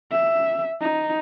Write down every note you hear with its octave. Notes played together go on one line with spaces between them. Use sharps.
E5
D#4